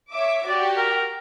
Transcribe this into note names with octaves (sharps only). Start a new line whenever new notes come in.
C#5 E5 D6
F#4 G4 D5
A#4